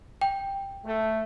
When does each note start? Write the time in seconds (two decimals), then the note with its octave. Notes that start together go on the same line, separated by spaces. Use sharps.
0.21 G5
0.85 A3